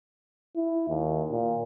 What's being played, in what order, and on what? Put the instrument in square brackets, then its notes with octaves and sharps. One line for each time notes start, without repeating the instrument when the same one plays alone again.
[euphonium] E4
D#2
A#2